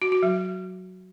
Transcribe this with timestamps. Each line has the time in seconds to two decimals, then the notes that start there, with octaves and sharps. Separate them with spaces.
0.02 F#4
0.12 F#4
0.23 F#3